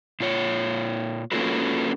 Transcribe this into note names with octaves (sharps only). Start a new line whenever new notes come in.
A#2 F4 C#5
A#3 C#4 F4 F#4 A4 B4